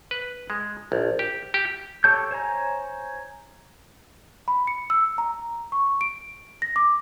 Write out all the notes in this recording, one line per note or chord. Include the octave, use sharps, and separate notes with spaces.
B4
G#3
A#1
G4
G4
G4 A4 C#5 A5 G6
C5 C#5 G#5 A#5
B5
C#7
E6
A#5
C#6
D7
A#6
D6